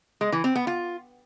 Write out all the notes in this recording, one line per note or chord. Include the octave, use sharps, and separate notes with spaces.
G#3
E3
C4
B3
F4